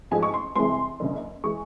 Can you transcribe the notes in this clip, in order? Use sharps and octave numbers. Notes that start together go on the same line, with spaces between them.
A1 G#2 F3 G#3 G#5
C#6
C6
C2 C3 E3 G#3 C6
F#1 F#2 D3
E3 G#3 C#6